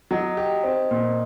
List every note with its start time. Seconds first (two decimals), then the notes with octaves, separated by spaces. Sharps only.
0.11 F#3 D#4
0.37 G4
0.64 C4
0.91 A#2